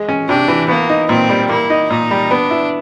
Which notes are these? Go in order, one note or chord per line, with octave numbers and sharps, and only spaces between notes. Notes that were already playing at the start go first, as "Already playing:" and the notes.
Already playing: G#3
C#4
C3 D4
E3
A#3 B3
D#4
A#2 C4
G3
A#3 E4
D#4
A#2 D#4
G3
B3 D4
E4